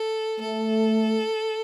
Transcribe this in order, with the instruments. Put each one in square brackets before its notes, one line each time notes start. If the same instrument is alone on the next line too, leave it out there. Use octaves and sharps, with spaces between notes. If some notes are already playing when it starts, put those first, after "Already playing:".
Already playing: [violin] A4
[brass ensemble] A3 [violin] A4